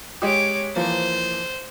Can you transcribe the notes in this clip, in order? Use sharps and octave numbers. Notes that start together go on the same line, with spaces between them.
G#3 G4 C#5 D6
E3 F3 A#3 C5